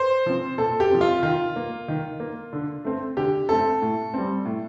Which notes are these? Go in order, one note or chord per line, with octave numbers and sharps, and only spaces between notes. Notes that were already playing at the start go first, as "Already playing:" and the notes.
Already playing: C5
F3 C4
A#2 A4
G4
F3 C4
F4
D#3 F4
A#3
D#3
A#3
D3
A3 C4
D3 G4
A3 C4 A4
A2
G3 C4
A2